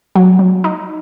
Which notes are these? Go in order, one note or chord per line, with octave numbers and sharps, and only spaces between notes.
F#3
F#3
D#4